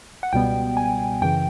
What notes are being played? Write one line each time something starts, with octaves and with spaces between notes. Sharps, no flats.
F#5
C#2 B2 G3 B3 G5
G#5
F#2 C#3 E3 G5